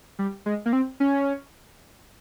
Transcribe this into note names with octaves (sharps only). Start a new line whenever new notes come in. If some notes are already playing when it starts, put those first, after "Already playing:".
G3
G#3
A#3
C4
C#4